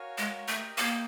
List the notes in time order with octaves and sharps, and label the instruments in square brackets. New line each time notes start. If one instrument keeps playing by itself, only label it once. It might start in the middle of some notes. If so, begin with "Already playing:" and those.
Already playing: [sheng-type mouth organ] F#4 A#4 C#5 F5 G#5
[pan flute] G#3
[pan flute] A3 [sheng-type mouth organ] G4 A#4 D#5 G5
[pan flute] A#3